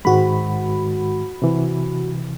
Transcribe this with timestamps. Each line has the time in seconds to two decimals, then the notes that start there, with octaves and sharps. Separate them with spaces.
0.05 G#2 D#3 G#3 F#4 B5
1.42 C3 E3